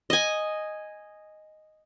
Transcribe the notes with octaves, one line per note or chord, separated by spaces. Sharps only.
D#5 G#5